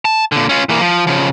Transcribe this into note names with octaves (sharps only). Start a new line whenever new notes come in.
A5
A#2 D3
C#4 F4
E3 A#3
F3
C#3 F3